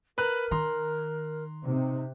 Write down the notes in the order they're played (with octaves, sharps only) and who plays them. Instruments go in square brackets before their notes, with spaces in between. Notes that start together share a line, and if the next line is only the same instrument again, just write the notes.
[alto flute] A#4 [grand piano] B4 A#5 F#6
[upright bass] D#3 [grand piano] A#5 C6
[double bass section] C3 [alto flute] D#4